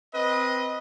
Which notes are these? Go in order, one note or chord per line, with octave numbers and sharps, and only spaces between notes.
C4 B4 D#5